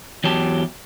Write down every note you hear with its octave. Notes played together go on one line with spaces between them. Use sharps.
E2 F#3 G4 A5